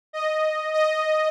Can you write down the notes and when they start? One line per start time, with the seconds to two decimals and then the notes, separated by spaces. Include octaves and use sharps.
0.13 D#5
0.73 D#5